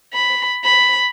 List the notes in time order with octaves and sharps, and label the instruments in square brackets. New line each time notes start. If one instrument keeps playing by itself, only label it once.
[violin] B5
B5